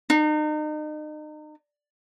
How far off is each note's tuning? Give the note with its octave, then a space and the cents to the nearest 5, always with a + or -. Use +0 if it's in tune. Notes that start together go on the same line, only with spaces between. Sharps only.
D#4 -35